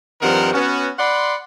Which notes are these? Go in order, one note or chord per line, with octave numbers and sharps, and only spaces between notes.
G2 D#3 F3 C4 A#4 F#5
B3 C#4 F#4
D5 F#5 B5 C6